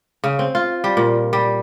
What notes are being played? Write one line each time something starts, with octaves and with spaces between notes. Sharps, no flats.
C#3
C4
F4
G3
A#2
G3